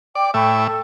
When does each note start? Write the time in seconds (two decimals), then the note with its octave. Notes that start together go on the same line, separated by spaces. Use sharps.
0.15 D5 G5 D6
0.34 A2 E5 G5 B5 C#6
0.66 A4